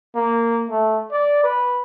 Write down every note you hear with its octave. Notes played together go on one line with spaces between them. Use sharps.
A#3
A3
D5
B4